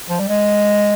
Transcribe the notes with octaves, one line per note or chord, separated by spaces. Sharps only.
F3
G3
G#3